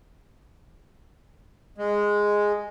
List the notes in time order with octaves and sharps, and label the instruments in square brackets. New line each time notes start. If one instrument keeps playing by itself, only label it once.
[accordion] G#3